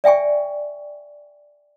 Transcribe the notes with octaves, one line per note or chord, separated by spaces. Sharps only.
D5 E5 G5 G#5 C#6